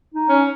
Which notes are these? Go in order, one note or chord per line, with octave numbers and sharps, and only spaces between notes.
D#4
C#4